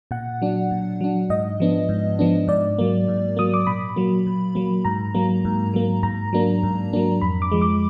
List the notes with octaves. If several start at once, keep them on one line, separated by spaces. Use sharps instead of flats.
A#2 F#5
F#3 D4
A#2
F#3 D4
G#2 D#5
F3 B3 D4
G#2
F3 B3 D4
G#2 D5
F#3 A#3
G#2
F#3 A#3 D#6
D6
A#2 B5
F#3 A#3
A#2
F#3 A#3
G#2 A#5
F#3 A#3
G#2
F#3 A#3
G#2 A#5
F#3 A#3 D4
G#2
F#3 A#3 D4
F2 B5
D6
F3 G#3
D6